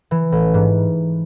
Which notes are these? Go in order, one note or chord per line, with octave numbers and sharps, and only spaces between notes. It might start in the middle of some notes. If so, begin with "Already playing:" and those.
E3
A1
G#2